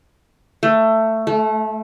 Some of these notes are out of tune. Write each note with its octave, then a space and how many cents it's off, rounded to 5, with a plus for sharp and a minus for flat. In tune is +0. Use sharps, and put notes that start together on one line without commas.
A3 +15
A3 -25